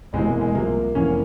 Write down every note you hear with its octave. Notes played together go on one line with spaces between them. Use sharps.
E1 E2 C3 E3 G#3 C4
A#3
G#3
C2 C3 F3 A#3
F1 E2 E3 A#3 C#4